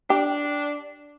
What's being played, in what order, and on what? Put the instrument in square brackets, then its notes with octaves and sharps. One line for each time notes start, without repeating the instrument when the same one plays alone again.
[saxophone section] D4 [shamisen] G4